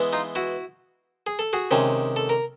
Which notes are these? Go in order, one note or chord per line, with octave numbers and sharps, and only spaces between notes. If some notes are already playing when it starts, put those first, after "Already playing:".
Already playing: E3 G#3 B3
D#4 F4
E4 F#4
G#4
A4
F#4 G#4
C3 D#3 G#3 C#4
A4
A#4